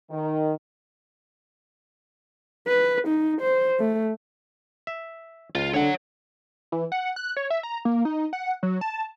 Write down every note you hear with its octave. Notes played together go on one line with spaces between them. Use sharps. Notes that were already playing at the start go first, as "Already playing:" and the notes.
D#3
B4
D#4
C5
A3
E5
C#2 F4
D3 C#5 F#5
E3
F#5
F#6
C#5
E5
A#5
A#3
D#4
F#5
F#3
A5